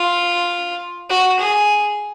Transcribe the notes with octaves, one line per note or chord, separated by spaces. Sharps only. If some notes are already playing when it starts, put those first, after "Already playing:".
Already playing: F4
F#4
G#4